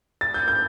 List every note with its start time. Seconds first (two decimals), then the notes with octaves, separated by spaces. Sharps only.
0.21 A6
0.34 G6
0.48 G6